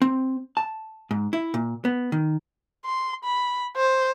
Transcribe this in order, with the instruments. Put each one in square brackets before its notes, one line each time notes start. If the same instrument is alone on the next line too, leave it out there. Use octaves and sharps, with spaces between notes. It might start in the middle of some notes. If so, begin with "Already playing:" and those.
[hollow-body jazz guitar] C4
A5
G#2
E4
A#2
B3
D#3
[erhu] C6
B5
C5